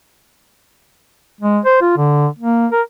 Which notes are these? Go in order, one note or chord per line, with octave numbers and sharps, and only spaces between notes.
G#3
C5
F4
D3
A#3
A#4